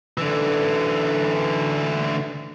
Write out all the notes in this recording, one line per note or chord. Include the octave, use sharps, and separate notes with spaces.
D3 E3